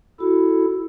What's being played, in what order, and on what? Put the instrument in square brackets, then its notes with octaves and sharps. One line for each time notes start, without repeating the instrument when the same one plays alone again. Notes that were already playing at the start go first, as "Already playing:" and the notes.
[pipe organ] E4 A4 [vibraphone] F#4